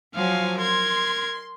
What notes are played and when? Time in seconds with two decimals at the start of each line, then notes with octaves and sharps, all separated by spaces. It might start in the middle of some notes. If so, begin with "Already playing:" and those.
0.15 F3 F#3 F5 G#5
0.59 A#4 C6 G#6